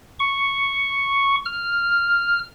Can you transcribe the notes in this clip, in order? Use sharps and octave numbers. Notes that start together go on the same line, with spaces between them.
C#6
F6